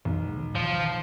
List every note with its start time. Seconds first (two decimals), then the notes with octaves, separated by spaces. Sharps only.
0.05 B1 E3
0.24 E2 G#3
0.37 D#3
0.55 F3